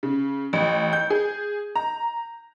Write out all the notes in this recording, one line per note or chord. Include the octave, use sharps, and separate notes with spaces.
C#3
A1
G6
G#4
A#5